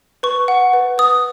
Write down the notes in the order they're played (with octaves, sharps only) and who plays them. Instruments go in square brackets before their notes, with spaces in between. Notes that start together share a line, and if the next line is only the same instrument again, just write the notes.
[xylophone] B4 C#6
F#5
B4
B4 D#6